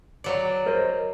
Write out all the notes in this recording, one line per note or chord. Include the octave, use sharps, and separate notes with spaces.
F#3 D5
A#4 C5 D#5